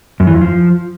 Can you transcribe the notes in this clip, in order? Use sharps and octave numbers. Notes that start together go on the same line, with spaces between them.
F#2
E3
F2
F3